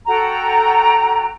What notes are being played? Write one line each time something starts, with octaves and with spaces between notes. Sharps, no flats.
F#4 A4 G5 A#5